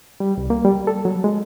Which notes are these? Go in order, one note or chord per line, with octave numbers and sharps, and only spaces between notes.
G3
C2
A#3
G3
A4
F#3
G#3